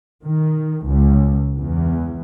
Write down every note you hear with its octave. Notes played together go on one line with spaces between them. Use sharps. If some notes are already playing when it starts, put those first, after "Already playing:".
D#3
C#2
E2